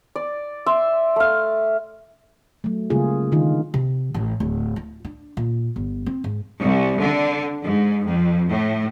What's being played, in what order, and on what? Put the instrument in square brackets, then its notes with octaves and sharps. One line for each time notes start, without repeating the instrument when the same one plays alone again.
[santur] D5
E5 C6
A3 F5
[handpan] F#3 A3
C#3 G3 G#3 A#3 F4 G#4
D3 D#3 D#4 F4
[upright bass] C3
A1
D1
E4
D4
A#2
G1
C4
G#2
[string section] C2
D3
G#2
F2
A2